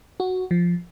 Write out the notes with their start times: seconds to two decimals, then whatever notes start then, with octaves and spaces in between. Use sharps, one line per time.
0.20 F#4
0.51 F3